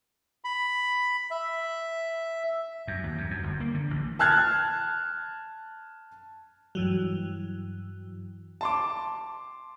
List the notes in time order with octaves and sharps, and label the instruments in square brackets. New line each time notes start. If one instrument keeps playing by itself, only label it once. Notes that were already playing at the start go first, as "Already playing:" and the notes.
[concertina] B5
E5
[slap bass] F#2
D#2
F#2
F#2
G1
A#3
D3
A1
[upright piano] A5 F6 F#6 G#6 A6
[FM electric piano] G2 E3 F#3
[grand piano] A5 C6 D6